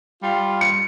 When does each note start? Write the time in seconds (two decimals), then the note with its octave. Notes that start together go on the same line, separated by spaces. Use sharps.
0.22 G3 F4
0.61 C#7